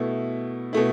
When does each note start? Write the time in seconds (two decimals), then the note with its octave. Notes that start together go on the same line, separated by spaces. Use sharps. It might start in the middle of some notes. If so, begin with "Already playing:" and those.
Already playing: B2 A3 E4
0.73 B2 A3 E4